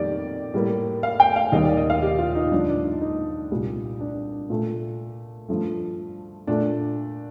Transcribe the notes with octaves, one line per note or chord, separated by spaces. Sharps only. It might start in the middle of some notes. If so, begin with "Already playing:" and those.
Already playing: F2 D#3 G3 A#3 G4 D5
A2 G3 A#3
F5
G5
F5
D#2 D#3 G3 A#3 D#5
D5
D#5
F5
G4
F4
D#4
G2 D3 F3 D4
D4
D#4
D#4
C2 A#2 G3
D4
A#2 A3
G2 F3 A3
A#2 A3 D4